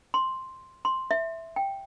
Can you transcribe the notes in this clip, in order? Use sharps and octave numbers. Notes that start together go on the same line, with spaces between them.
C6
C6
E5
G5